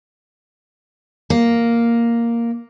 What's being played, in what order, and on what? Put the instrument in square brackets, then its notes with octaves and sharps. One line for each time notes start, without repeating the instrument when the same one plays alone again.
[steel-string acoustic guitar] A#3